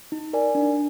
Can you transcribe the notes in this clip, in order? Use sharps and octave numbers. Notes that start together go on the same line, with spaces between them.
D#4
A#4 D5 G#5
D4